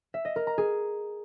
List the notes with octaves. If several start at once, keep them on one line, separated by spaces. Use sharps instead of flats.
E5
D#5
A#4
A#5
G#4